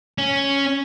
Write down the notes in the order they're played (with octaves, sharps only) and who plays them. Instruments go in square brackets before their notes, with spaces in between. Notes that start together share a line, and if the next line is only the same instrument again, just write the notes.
[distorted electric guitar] C#4